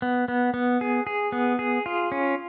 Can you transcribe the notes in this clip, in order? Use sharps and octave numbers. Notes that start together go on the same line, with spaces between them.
B3
B3
B3
G#4
G#4
B3
G#4
F4
C#4